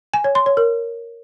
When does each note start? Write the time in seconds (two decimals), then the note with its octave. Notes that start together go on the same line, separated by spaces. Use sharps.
0.14 G#5
0.24 C#5
0.35 C6
0.46 C#5
0.57 A#4